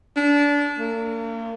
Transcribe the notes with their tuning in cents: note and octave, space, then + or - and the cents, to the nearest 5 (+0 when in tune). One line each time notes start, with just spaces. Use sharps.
D4 -25
A#3 -40